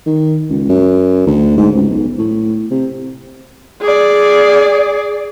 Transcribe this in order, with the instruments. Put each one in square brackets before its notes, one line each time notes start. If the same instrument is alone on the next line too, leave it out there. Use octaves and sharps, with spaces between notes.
[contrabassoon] D#3
C#2
F#2
D2
G#2
C#2
B1
A2
C3
[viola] G#4 D5